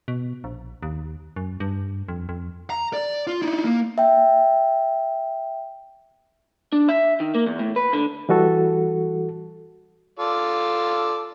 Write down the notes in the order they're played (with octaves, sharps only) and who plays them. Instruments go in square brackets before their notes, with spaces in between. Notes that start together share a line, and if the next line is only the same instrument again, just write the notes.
[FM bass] B2
A#1
D#2
F#2
G2
F2
F2
[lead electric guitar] A#5
D5
F4
D#4 E4
A#3
[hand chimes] E5 G5
[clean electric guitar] D4
E5
D#3
A#3
E2
A2
B4
D3
[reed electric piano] E3 G3 F#4 A4
[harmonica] F4 A4 D5